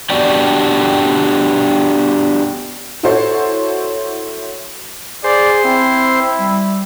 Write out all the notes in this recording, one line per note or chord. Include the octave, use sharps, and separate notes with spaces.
B3 D4 F#4 G4 D5 G5
E4 F#4 A4 C5 C#5
G#4 C5 D5
C4 E4
G3